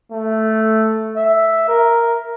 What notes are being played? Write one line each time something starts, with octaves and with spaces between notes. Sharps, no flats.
A3
E5
A#4